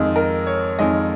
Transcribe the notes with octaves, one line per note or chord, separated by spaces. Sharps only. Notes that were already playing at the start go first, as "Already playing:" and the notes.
Already playing: F2 D#3 G#3 D#5
A#4
C#5
F2 D#3 G#3 D#5